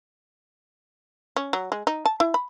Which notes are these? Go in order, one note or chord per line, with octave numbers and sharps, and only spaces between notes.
C#4
F#3
G#3
D#4
A5
E4
B5